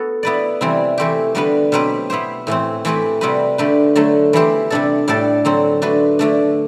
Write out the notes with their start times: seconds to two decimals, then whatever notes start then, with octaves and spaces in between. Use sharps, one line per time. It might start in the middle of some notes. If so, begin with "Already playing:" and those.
Already playing: B3 F#4 A4
0.23 B3 E4 B4 D5
0.61 C3 E3 G3 C4 E4
0.98 E3 A3 C4 G4
1.35 D3 G3 B3 F#4 B4
1.72 B2 F#3 C4 G4 B4
2.10 B3 E4 G4 C5
2.47 A2 E3 A3 C4
2.85 E3 A3 C4 G4 B4
3.21 C3 G3 C4 F#4 B4
3.58 D3 A3 D4 G4 B4
3.95 D3 F#3 A3
4.33 E3 B3 E4 G4 C5
4.70 C3 G3 D4 A4
5.08 A2 G3 D4 A4 D5
5.45 D3 F#3 C4
5.82 A3 D4 F#4 B4
6.19 D3 A3 D4